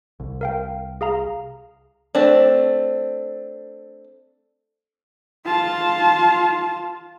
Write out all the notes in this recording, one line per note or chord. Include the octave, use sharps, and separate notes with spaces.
C2
A#4 F5 G5
G#4 F5 A#5
A3 C4 D4
F4 A5